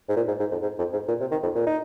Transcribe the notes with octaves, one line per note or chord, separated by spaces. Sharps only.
G#2
A#2
G#2
G#2
F2
G#2
F2
G#2
A#2
C3
D#3
F2
A#2
D#4